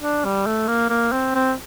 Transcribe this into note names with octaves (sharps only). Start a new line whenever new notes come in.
D4
G3
A3
A#3
A#3
C4
C4